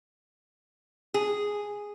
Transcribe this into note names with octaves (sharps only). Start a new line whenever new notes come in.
G#4